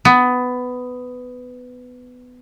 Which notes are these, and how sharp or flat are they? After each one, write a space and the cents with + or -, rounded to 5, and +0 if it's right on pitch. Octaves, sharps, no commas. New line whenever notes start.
B3 +15